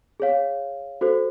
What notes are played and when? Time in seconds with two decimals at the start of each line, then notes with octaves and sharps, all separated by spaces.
0.20 G#4 C#5 F5
1.01 F#4 A4 C5